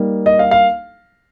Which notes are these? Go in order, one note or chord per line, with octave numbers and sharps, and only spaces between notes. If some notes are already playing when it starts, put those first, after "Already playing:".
Already playing: G3 A#3 D#4
D#5
F5
F5